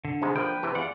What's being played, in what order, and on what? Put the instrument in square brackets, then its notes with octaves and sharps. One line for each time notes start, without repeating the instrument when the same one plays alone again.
[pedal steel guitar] D3
[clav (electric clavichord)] G#2 C3 G#3
[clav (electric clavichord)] D3 F3 A#3 [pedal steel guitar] B4 G5
[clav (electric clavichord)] C3 E3 G4
[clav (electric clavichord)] E2 [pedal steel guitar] F4 D5 F#5